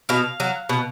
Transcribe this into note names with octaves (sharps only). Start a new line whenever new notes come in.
B2 F5
F#3
B2